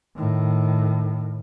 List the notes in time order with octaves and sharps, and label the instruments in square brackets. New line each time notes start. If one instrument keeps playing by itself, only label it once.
[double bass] A2 D#3